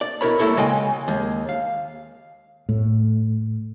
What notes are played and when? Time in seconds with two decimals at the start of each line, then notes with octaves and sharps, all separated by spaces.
0.01 D5
0.21 B2 E4 A#4 C#5 B5
0.39 G3 A3 A#3 E4 A4 C#5
0.57 C#3 G#3 G5 G#5
1.08 D#2 G#3
1.49 F5
2.69 A2